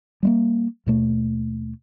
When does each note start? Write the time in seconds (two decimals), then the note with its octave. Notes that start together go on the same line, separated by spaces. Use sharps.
0.23 G3 A3 A#3
0.86 D#2 B2 A3